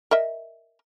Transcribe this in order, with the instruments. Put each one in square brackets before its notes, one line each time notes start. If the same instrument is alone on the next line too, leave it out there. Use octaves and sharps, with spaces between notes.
[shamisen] A#4 D#5 E5